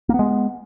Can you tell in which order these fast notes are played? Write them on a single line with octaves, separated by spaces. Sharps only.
A#3 B3 G#3